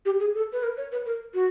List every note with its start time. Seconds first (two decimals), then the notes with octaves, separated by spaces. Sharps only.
0.05 G4
0.20 G#4
0.35 A4
0.52 B4
0.63 A#4
0.77 C#5
0.92 B4
1.06 A#4
1.34 F#4